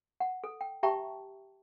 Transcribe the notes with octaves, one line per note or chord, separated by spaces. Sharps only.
F#5
A4
G5
G4 E5 G5 A5 A#5 C#6